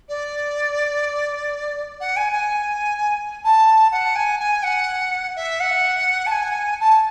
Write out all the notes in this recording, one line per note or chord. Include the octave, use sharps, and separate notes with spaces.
D5
F#5
G#5
G#5
A5
F#5
G#5
G#5
F#5
E5
F#5
A5
G#5
A5